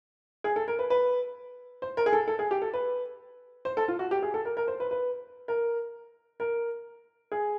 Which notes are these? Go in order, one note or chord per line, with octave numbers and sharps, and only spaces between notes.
G#4
A4
A#4
B4
B4
C5
A#4
G#4
A4
A4
G#4
G4
A4
B4
C5
A4
F4
F#4
G4
G#4
A4
A#4
A#4
C5
B4
B4
A#4
A#4
G#4